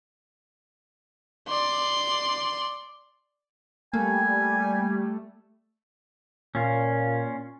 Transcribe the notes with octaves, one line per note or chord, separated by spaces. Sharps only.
D5 C6
G3 A3 A#3 G#5
A#2 C#4 F4